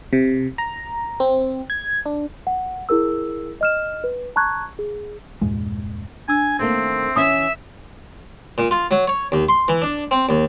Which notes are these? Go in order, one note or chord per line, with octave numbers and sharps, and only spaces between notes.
C3
A#5
C4
G#6
D4
F#5
E4 G#4 A#4 E6
D#5 F6 E7
B4
A5 A#5 C#6 F#6 G#6
G#4
E2 G2 A#2 G#3
D4 G#5 E6
D#3 A3 A#3 C4
E3 C#4 E4 E5 D#6
A#2
F4
F#3
C#5
D#2
C6
E3
D4
C4
D#2